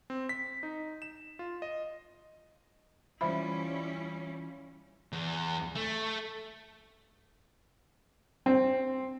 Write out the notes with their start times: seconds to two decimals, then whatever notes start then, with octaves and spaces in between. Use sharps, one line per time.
0.10 C4
0.29 B6
0.63 D#4
1.02 E7
1.39 F4
1.62 D#5
3.21 E3 G3 C#4 E4 F4 C5 E5 B5
5.13 E2
5.75 A3
8.46 C4